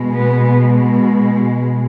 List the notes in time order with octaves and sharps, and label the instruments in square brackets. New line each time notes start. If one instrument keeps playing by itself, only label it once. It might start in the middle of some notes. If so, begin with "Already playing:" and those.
Already playing: [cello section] B2 G#3
B3